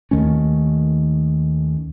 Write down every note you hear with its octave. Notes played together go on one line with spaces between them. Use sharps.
D#2 D#3 A3 C#4